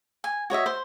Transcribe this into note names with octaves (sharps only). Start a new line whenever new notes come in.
G#5
F#4 C#5 D#5 E5
C5